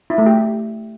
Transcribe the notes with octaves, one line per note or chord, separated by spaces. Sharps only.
E4
A3
G4